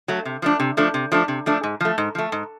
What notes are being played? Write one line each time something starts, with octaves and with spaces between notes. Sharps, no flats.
F#3 A3
C3
F3 A3 D4
C3
F3 A3 D4
C3
F3 A3 D4
C3
F3 A3 D4
G#2
F3 A3
G#2
F3 A3
G#2